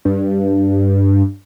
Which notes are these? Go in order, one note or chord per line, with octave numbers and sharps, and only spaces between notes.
G2